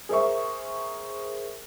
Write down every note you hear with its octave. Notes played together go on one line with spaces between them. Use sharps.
G#4 A#4 C5 E5 C#6